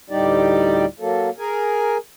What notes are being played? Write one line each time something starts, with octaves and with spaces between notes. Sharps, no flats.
D2 A2 G3 D#4 G4 D5
F#3 A#3 A4
G#4 A#4 G#5